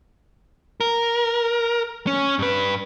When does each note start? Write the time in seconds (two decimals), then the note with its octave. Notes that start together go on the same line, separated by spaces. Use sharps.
0.81 A#4
2.07 C#4
2.39 G2 B4